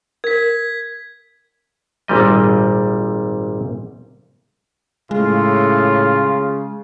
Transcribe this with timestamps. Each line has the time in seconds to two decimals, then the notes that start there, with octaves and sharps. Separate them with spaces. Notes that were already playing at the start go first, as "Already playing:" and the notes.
0.24 A#4 G#6 B6
2.08 G#1 A#2 G3 D#5
5.11 A2 C#3 G#3 F4